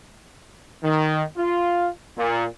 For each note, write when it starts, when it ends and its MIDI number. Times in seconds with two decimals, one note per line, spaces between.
0.84 1.23 51
1.37 1.88 65
2.17 2.45 46